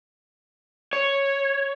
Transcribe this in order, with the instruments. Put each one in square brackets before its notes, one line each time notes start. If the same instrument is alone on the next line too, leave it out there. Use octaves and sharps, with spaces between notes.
[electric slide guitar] C#5